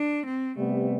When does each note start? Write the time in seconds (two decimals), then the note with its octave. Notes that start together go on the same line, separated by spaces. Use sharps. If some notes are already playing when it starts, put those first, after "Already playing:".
Already playing: D4
0.25 C4
0.56 C3 G3 A3 B3